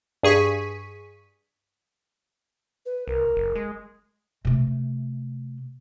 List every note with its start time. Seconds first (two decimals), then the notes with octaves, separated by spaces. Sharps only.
0.23 G2 G#4 C#6 B6 D#7
2.86 B4
3.07 C2 A#4
3.36 F#1
3.55 G#3
4.45 C3 A3